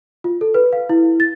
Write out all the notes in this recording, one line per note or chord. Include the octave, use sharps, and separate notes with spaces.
F4
A4
B4
F5
E4
A6